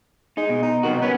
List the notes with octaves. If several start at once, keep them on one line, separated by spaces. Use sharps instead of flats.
G#3 D#4
B2
D#4
B1 C3 D#3 F#4
B3 C#4 B4